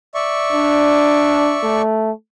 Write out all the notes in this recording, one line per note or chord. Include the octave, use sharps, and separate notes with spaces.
D5 E5 C#6
D4
A3